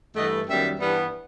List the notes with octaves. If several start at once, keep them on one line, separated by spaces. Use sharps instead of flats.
G2 E3 A3 D#5 F#5
F#2 D#3 G3 B3 E5 G5
G2 E3 G3 B3